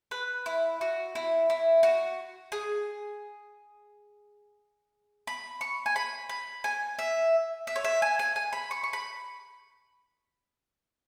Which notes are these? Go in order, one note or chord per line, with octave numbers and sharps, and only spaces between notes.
B4
E4
F#4
E4
E4
F#4
G#4
B5
C#6
G#5
B5
B5
G#5
E5
E5
C#5
E5
G#5
G#5
G#5
B5
C#6
C#6
B5